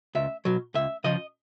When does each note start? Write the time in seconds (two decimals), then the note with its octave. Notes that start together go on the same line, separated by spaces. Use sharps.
0.15 C#2 E5
0.45 B2 F#3
0.74 C#2 E5
1.04 C#3 F3 D#5